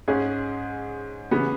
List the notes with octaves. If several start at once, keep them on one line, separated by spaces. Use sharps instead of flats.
G#2 G#3 C#4 G#4
C#3 E3 B3